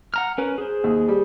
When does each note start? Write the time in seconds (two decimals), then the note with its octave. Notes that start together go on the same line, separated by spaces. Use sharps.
0.14 F#5 A#5 F6
0.38 C#4 A#4 B4
0.58 G#4 C5
0.84 D#2
1.08 G3